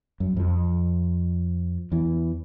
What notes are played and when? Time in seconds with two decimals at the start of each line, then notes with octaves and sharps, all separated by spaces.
0.20 F#2
0.37 F2 F3
1.92 E2 E3